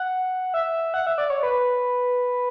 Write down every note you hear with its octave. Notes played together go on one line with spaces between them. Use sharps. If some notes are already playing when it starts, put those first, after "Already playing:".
Already playing: F#5
E5
F#5
E5
D5
C#5
B4